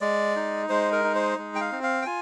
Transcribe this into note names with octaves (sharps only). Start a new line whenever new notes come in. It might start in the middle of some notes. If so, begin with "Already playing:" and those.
G#3 D5
D#4
G#3 C5
A#4
D#4
C5
G#3
G5
F5
C4
F5
G5
F4 G#5